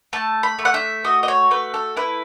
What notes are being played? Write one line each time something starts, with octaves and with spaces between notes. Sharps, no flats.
A3 A5
B5
A3
F#5
E5
F#4 D#5
D#5
C#5
A3 B4
A4
E4 B4